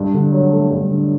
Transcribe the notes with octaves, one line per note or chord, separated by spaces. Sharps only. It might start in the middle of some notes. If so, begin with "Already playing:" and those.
Already playing: G2
D3
F#3
A3
G2
D3